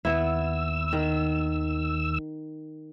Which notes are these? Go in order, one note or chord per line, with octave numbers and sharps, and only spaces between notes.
D#2 B3 E4 E6
D#3